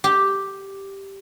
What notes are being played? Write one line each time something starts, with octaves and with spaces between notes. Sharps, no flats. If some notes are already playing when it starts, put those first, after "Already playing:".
G4